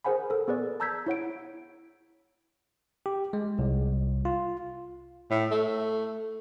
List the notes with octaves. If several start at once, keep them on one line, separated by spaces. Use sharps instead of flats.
G#4 A#4 C5 F#5 G#5 B5
A4 A#4
B3 G#4 B4 D5
A5 A#5 E6 G6 G#6 B6
E4 C#5 F#5 D7
G4
G#3
C2
F4
A2
A3